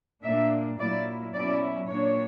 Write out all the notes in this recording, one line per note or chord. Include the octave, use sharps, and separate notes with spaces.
A#2 A#3 D4 E5
A#2 F#3 A#3 E4 D5
B2 F#3 C#4 E4 D5
A#2 A#3 D4 C#5